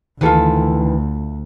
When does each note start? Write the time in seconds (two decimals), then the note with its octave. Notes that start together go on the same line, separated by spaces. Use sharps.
0.21 D2 D#3 E3 F4 A4 B4